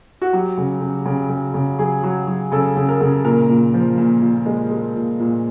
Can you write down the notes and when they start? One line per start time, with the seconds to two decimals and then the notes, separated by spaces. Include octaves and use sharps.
0.22 F#4
0.33 F#3 G4
0.58 C#3
0.81 C#3
1.06 C#3
1.30 C#3
1.54 C#3
1.79 F#3 G#4
2.03 F#3
2.27 F#3
2.52 C#3 A4
2.76 C#3
2.89 A#4
3.01 C#3
3.24 A#2 A#4
3.49 A#2
3.74 F3
3.98 A#2
4.22 A#2
4.46 G#3
4.71 G#3
4.96 A#2
5.19 A#2